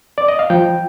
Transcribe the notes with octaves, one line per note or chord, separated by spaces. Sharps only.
D5
D#5
F5
F3 G5